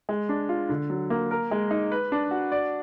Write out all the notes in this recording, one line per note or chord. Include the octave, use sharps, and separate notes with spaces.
G#3
D4
F4
D3
F#3
A#3
A#4
G#3
D#4
B4
D4
F#4
D5